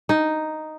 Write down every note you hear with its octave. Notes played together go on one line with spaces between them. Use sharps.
D#4